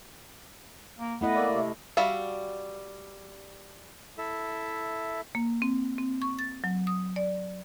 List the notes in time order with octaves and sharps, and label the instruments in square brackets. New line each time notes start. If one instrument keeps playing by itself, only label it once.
[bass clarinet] A#3
[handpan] A3 E4 D#5 [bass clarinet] B3
[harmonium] A#3 D5 E5
[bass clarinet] C3
[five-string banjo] G3 F#4 E5 F5
[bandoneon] E4 A4 E5
[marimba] A#3
C4
C4
C#6
A6
F#3
D#6
D5